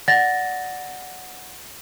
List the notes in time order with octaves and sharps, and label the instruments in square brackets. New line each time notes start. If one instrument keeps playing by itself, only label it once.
[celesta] D5 F#5 A6 A#6